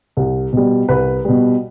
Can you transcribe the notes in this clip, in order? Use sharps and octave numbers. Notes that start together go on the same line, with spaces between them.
C2
B2 G3
C2 B4 B5
B2 G3